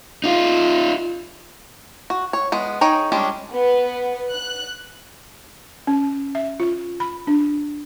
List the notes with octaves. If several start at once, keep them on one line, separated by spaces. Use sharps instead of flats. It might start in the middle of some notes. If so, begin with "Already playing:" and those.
D#4 F4
F#4
C#5
G#3 B3
D#4 G#4 C#5 G5 G#5
G3 G#3 C#4 D4
B3
F#6
C#4
E5
F4
B5
D4